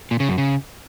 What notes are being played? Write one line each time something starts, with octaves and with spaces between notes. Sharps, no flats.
A#2
C#3
F#2
C#3